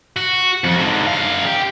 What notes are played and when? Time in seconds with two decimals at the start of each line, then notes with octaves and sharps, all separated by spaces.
0.17 F#4
0.64 F2
0.77 G#2 D3
1.07 F#2 F5
1.46 G4